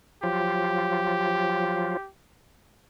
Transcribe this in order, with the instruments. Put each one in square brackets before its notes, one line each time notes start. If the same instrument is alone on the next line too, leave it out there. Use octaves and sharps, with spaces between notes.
[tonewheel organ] F3 F#3 F4 [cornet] G4